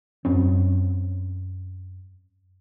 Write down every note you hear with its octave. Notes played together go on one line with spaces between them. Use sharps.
F#2 C4 C#4